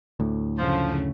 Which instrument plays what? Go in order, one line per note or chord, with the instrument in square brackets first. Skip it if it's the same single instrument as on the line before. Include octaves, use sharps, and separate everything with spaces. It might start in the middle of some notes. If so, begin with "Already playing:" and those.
[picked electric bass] D2 A2
[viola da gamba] F#2 C#3 A3 [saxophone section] F3